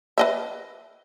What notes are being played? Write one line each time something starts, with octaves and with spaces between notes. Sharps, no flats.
B4 D#5 E5